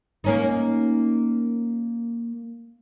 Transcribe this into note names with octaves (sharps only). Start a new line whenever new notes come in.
A#3 C#4 D#4